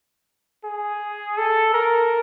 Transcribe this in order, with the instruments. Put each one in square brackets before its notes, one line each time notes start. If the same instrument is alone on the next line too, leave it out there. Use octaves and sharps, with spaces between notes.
[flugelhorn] G#4
A4
A#4